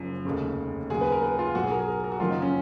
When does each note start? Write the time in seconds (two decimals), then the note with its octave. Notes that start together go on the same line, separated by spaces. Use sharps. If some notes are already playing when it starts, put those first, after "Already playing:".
Already playing: F#1 F#2 F3
0.25 F1 D#2 C#3
0.90 D#2 C#3 F#3 G#4
1.01 B4
1.12 A#4
1.23 B4
1.39 F4
1.55 B1 B2 F#3 F#4
1.63 G#4
1.71 A#4
1.80 G#4
1.88 A#4
2.04 A#4
2.12 F#4
2.20 F#1 F#2 D#3 F#3 F4
2.31 D#4
2.42 C#4